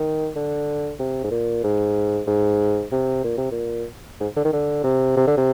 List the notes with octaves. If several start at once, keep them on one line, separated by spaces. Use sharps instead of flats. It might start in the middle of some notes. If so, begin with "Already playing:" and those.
Already playing: D#3
D3
C3
G#2
A#2
G#2
G#2
C3
A#2
C3
A#2
G#2
D3
D#3
D3
C3
C3
D3
C3